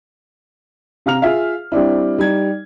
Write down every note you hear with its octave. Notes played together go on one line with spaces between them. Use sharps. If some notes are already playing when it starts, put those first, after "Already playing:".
C3 F5 A#5 F6 F7
F4 G#4 E5 F5
G3 C4 D4 E4
G3 D#4 G#6